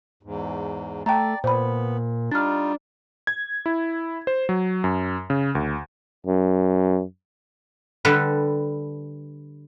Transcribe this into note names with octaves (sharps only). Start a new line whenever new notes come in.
E2 G#2
A3 D5 G5 A5 A#5
A#2 B3 C5 B5
G3 D4 D#4 F4 F6 A6
G#6
E4
C5
F#3
F#2
C#3
D2
F#2
D3 G3 A4 B4